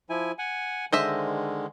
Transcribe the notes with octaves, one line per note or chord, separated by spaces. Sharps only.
F3 E4 G#5
F#5 G#5
D3 D#3 G#3 C5 D#5 E5